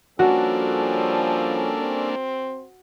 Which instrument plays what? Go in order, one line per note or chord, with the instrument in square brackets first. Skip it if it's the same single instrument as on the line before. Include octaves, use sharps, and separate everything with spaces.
[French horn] F3 [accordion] G3 C#4 A4 [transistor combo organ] A#3 D4 [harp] F#4
[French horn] C4